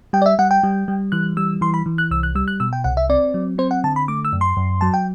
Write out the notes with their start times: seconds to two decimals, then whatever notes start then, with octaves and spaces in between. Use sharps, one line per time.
0.13 G3 G5
0.22 D5
0.26 E5
0.39 G3 F#5
0.51 G5
0.63 G3
0.88 G3
1.12 E3 F#6
1.37 G3 E6
1.61 E3 C6
1.74 B5
1.86 E3
1.98 F#6
2.11 C2 E6
2.23 F#6
2.35 G3 E6
2.48 F#6
2.60 B2 E6
2.73 G5
2.84 C2 F#5
2.97 E5
3.10 C4 D5
3.34 F#3
3.58 C4 C5
3.71 F#5
3.84 D3 A5
3.96 B5
4.08 A3 D6
4.25 E6
4.33 F#2
4.41 C6
4.57 F#2
4.81 F#3 A5
4.94 G5